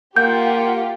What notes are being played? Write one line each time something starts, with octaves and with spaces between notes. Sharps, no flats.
A#3 F4 G4 F#5 G6